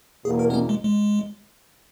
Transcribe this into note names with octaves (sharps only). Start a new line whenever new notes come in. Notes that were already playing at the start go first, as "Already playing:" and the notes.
E2 B2 A#3 G#4
A#4
B3
C#4
G#3
G#3